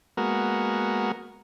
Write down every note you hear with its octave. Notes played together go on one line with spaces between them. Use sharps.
G#3 A#3 B3 F#4 A#4